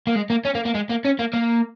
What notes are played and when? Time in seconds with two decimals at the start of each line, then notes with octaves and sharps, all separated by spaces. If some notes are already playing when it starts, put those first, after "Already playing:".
0.07 A#3
0.15 G#3
0.30 A#3
0.45 C#4
0.55 A#3
0.65 A#3
0.75 G#3
0.89 A#3
1.05 C#4
1.19 A#3
1.33 A#3